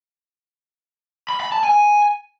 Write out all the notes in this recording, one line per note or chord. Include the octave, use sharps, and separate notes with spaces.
B5
B5
A5
G#5